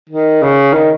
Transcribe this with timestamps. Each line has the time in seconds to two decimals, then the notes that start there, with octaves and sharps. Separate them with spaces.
0.10 D#3
0.43 C#3
0.74 D#3